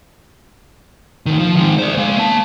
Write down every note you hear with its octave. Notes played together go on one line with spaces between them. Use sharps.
D2 D#3
F3
D#3 G#3
C5 D5
G#3 F5
A#3 A5